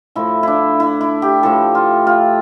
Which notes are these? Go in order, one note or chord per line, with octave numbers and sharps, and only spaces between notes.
A2 F3 A3 E4
D4 E4
E4
E4
G4
A2 F3 A3 A4
F4
F4